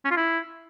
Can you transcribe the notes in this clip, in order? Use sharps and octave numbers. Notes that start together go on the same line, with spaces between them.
C#4
F4
E4